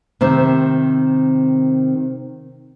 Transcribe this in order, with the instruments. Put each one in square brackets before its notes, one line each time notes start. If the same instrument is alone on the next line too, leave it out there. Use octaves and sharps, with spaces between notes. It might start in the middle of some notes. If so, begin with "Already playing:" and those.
[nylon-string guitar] C3 D#3 C4